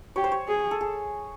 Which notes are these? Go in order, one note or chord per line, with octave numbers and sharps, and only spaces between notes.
G4 C#5
C5
C#5
G#4
A4
G#4